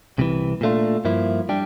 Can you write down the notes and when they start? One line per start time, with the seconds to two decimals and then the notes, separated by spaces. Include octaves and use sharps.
0.18 C2 C3 E3
0.61 A#2 A3 D4 F4
1.05 G2 F3 A#3 E4
1.49 G3 D4 G4